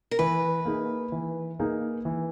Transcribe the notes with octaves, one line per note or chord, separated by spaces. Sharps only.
A#4
E3 B4
A#3 D#4 G#4
E3
A#3 D#4 G#4
E3